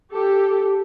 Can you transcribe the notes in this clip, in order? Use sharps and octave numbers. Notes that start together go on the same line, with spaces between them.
G4 A4